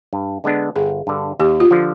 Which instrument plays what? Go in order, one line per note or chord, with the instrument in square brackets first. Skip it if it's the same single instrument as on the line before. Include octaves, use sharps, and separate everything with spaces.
[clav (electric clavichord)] G2
D3 G#3 B3 D4
[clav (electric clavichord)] G1 [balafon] G#4
[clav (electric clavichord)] G2 D3
[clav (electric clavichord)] D#2 [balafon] G4
[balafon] F4
[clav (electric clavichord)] D3 F3